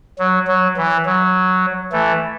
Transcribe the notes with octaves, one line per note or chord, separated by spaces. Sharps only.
F#3
F#3
E3
F#3
E3 A3